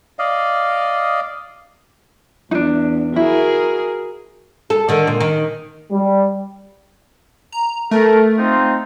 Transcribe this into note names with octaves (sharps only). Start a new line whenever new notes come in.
D5 D#5 F5
E2 D4 D#4
E4 F#4 G#4 A#4
A4
D3 D#3
A#2
D#3
G3
A#5
A3 A4 A#4
C4 D#4 F4